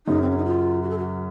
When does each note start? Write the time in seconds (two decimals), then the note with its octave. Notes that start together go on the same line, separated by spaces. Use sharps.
0.07 F#2 C#3 F#3 D#4
0.22 C4
0.30 C#4
0.38 D#4
0.45 F4
0.82 F#4
0.90 A4
0.98 F#4